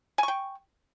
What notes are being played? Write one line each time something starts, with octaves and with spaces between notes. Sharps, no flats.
G5 G#5 C#6